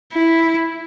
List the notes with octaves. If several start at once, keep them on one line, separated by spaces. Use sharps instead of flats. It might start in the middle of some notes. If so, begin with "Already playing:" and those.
E4